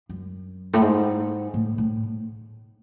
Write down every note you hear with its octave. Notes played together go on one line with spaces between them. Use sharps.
F#2
A2
G#2
A2
A2